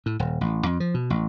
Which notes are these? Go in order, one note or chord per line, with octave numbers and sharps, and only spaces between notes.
A2
D#1
A1
F2
F3
B2
A1